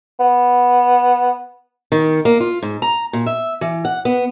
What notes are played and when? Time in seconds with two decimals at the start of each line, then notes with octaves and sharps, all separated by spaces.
0.20 B3
1.92 D#3
2.25 A#3
2.40 F4
2.62 G#2
2.82 A#5
3.13 A#2
3.26 E5
3.61 E3
3.85 F#5
4.05 B3